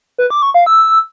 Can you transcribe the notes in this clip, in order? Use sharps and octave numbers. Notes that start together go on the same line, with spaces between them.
B4
D6
C#6
F5
E6